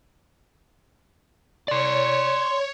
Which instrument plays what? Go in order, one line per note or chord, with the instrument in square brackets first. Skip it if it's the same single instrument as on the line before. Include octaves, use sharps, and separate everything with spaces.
[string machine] C#5 [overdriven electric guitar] D5 C6